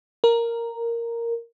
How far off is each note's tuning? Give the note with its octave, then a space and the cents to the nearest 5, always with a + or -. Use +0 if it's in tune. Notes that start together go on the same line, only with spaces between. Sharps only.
A#4 -5